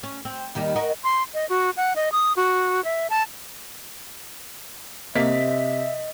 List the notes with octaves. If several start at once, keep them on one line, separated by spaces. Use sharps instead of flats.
C#4
C4
D#2 D#3 G3
F#4 A#4 D#5
C6
D#5
F#4
F#5
D#5
D#6
F#4
E5
A5
C3 A#3 D#5 E5 B6